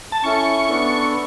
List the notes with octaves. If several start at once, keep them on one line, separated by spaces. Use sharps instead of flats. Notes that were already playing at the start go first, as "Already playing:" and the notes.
A5
C#4 E4 A4 C#6
B3 D4 A4